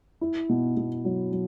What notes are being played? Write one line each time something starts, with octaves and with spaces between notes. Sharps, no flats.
E4
B2
B2
F#3
F#3